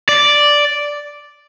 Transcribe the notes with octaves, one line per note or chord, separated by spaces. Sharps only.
D5